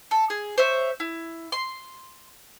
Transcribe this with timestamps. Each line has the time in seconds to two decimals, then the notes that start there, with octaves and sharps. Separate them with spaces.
0.11 A4
0.30 G#4
0.57 C5 C#5 E5
1.00 E4
1.52 C6